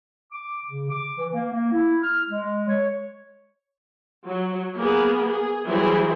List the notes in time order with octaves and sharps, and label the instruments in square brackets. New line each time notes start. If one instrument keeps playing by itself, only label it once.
[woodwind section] D6
C#3
D6
E3
A#3
A#3
E4
F6
G#3
C#5
[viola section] F#3
A#3 B3 G#4
G#4
E3 F#3 G3 E4 G#4 C5